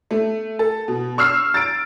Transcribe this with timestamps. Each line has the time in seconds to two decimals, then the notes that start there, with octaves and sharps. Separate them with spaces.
0.11 A3
0.59 A4
0.88 B2
1.18 C#6 E6 F6 C7
1.54 A6 D7